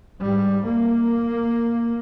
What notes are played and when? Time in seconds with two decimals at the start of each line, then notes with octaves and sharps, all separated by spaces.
0.21 G#2 G3
0.64 A#3